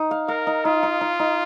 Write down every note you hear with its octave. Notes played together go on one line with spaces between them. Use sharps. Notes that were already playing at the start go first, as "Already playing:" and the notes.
Already playing: D#4
F5
A#4 F5
D#4
D#4 F4
D#4
D#4
D#4